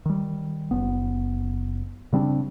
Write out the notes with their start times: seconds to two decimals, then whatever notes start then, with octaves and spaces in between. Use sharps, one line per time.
0.06 D#3 G3
0.71 F#1 B3
2.13 C#3 G3 C4 D4